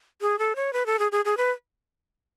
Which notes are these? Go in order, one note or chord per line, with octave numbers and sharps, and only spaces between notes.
G#4
A4
C#5
B4
A4
G#4
G#4
G#4
B4